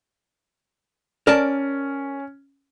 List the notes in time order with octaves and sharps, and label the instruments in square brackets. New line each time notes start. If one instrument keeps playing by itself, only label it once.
[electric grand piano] C#4 [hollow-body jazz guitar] A#4 D5 A5